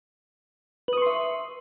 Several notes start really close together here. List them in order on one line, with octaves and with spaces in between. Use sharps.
B4 D#6 C#6 C6 E5